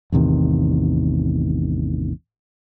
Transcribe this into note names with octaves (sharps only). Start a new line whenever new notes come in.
A1 E2 C3 D#3